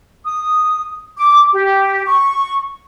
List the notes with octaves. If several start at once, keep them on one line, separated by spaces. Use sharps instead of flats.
D#6
D6
G4
C#6